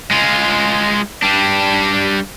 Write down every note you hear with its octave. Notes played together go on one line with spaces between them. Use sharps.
G#3 F4
G3 D4